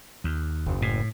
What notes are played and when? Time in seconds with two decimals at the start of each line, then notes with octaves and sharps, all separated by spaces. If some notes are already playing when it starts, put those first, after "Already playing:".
0.24 D#2
0.66 F#1
0.82 A2